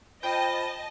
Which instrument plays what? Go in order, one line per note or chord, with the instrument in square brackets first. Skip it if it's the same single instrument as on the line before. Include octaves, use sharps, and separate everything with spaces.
[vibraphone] F4 C5 B5 [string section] D#5 A5 [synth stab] G5